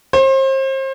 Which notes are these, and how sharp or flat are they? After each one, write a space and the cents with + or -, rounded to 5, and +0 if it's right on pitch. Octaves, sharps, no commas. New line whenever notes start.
C5 +35